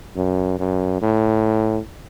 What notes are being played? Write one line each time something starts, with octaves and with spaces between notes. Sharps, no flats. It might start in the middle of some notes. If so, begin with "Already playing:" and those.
F#2
F#2
A2